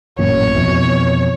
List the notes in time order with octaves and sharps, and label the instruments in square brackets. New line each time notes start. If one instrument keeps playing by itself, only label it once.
[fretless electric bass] A1 F#2 A#2 [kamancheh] C#5
[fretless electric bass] F2 B2 E3